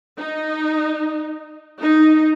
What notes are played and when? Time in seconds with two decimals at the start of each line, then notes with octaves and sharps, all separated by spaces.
0.18 D#4
1.81 D#4